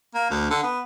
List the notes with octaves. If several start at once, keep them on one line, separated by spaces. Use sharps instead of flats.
A#3
D2
D3
B3